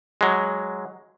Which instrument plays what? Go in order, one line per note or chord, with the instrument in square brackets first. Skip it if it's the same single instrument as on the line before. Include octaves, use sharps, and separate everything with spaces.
[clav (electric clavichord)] F#3 G#3